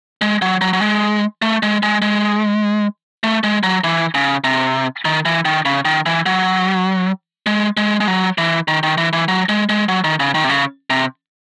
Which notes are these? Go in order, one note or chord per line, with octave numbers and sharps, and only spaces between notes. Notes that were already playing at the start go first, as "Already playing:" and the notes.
G#3
F#3
F#3
F#3
G#3
A3
G#3
G#3
G#3
A3
G#3
F#3
E3
C#3
C3
D#3
E3
D#3
C#3
D#3
E3
F#3
G#3
G#3
G#3
F#3
E3
D#3
D#3
E3
E3
F#3
G#3
G#3
F#3
D#3
C#3
D#3
C3
C#3
C3